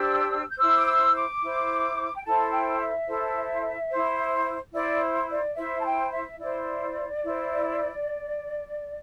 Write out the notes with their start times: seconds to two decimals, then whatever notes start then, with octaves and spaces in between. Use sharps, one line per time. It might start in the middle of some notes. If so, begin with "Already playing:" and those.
Already playing: D4 G4 C5 E6
0.50 G6
0.58 E4 C5 E6
0.75 D6
0.86 E6
1.13 D6
1.41 E4 C5
2.16 G5
2.25 E4 A4 C5 A5
2.52 G5
2.79 E5
3.07 E4 A4 C5
3.90 E4 C5
4.73 E4 C5 D5
5.29 D5
5.55 E4 C5 E5
5.79 A5
5.84 G5
6.11 E5
6.39 E4 C5 D5
7.23 E4 C5